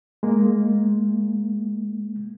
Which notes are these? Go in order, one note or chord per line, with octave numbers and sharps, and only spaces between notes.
G#3 A#3